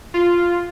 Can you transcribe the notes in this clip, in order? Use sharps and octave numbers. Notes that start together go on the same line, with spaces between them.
F4